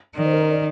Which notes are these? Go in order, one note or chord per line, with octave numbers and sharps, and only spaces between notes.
D#3 D5
C5
A#4
C5
D5